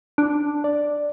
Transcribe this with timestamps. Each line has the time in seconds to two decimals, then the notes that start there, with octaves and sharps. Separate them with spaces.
0.18 D4
0.64 D5